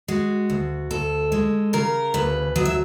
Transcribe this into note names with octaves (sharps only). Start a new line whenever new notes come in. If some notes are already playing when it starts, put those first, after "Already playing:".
G#3 F#4
D2
D2 A4
G#3
C#3 A#4
D2 B4
F#3 D#5
E5